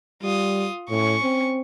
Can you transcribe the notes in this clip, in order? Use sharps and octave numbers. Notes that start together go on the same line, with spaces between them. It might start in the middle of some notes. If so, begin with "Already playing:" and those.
G3 F4 D#6
A2 C#4 C#6
C4